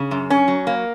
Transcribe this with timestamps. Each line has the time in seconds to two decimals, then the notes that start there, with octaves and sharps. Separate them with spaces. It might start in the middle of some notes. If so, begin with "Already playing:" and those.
Already playing: C#3
0.11 F#2
0.30 C#4
0.48 F#3
0.67 A#3